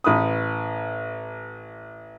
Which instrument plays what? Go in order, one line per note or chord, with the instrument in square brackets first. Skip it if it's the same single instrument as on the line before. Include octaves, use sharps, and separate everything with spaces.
[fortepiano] A1 B4 D#6